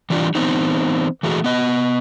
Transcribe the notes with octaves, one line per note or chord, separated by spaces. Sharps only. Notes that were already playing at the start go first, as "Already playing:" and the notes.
E3 G3 D4 F4
E3 B3 C4 D#4
E3 A3 F#4 G#4
B3 D#5